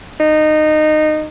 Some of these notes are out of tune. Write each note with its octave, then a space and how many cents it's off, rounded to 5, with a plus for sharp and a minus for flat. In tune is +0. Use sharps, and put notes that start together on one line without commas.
D#4 -20